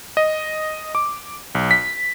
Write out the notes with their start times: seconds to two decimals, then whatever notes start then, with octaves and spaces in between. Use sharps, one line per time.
0.17 D#5
0.95 D6
1.55 B1
1.71 B6